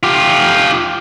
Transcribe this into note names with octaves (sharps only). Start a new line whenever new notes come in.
F4 G4